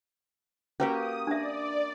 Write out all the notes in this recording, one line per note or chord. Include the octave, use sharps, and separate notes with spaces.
A#3 C#4 F#4 G4 B4 D#6
D4 D5 E5